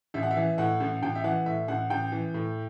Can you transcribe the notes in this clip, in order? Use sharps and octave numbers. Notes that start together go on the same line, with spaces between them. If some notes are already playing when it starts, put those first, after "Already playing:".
A1 E5
F#5
E5
E3
A2 F#5
A1
A1 G5
E5
E3 F#5
A2 E5
A1 F#5
A1 G5
E3
A2